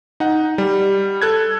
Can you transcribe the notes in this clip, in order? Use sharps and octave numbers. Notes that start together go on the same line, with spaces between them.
D#4 F#5
G3
A4 F#6 G#6